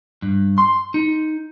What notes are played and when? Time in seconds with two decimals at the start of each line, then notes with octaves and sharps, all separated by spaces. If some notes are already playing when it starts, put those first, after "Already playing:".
0.22 G2
0.58 C6
0.94 D#4